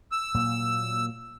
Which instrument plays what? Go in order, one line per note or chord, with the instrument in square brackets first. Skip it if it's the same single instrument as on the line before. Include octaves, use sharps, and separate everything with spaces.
[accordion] E6
[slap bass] A#2 F#3 A#3